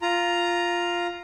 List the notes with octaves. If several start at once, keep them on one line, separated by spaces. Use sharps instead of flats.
F4 A#5